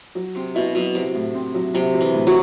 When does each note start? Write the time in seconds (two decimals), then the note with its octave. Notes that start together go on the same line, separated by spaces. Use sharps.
0.15 F#3
0.35 C3 C4
0.55 B2 E4
0.75 B2 F#3
0.94 C3 F#3
1.15 A2
1.35 C4
1.54 F#3
1.74 C3 F#3
1.94 F#3
2.01 E3
2.14 A2
2.27 F#3